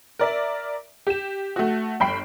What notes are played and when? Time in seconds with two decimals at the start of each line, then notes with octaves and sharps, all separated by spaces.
0.19 A#4 D5 E5
1.07 G4 E7
1.56 A3 F#4
2.00 G1 G5 B5 C7 D7